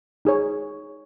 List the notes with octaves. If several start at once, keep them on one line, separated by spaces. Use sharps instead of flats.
D#4 G#4 C#5